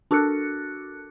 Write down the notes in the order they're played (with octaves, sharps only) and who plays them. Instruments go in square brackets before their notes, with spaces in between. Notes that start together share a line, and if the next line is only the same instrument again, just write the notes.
[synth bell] D4 F#4 A4 A#4 F#6 C#7